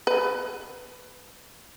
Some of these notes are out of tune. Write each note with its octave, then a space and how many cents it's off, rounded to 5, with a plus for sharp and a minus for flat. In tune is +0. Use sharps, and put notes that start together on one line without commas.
B4 +15